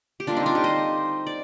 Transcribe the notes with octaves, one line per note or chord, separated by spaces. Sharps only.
G4
D3 G3 A#3 D4 F4
C4 D#4
D4 F4
D#4 G4
C5 D#5
D5